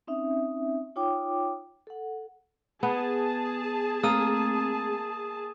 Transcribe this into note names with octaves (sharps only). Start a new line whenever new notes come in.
C4 C#4 D#4 E5
D#4 F4 C#5 G5 D6
A4 F#5
B3 G#4 A5
A3 A#3 C4 D#6 E6 D#7